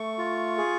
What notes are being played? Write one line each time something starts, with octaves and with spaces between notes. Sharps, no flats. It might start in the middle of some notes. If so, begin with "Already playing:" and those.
Already playing: A3 C#6
F4
G#4